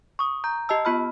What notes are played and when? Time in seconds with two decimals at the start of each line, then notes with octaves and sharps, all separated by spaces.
0.19 C#6 D#6
0.44 A#5 G6
0.69 G4 D#5 A5 E6
0.85 B3 F4 B5 F6